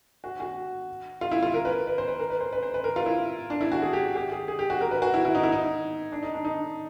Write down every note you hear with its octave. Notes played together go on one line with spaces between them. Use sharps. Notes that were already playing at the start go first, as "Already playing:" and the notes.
F#4
F#4
F4
E4
F4
A#4
B4
B4
C5
B4
A#4
B4
C5
B4
C5
B4
A#4
F4
E4
D4
E4
F#4
G#4
G4
G4
G#4
G#4
G4
F#4
A#4
B4
F#4
E4
E4
D#4
E4
D#4
D4
D#4
D4
D#4